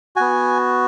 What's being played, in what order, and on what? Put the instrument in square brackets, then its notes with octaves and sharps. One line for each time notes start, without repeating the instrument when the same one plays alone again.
[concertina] B3 F#4 G#5